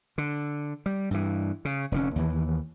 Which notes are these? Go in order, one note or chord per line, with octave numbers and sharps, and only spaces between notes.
D3
G3
G2 E3
C#3
F1 D3 C#4
D#2 E3